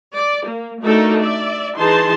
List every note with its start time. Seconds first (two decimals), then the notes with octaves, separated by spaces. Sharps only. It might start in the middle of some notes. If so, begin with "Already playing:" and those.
0.14 D5
0.46 A#3
0.83 A3 D4 D#4 F#4 A4 A#4
1.21 D5 E5
1.77 E3 D#4 G#4 A5 C6